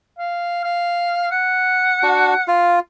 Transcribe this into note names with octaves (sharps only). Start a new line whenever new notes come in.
F5
F5
F#5
D4 F#4
F4 F5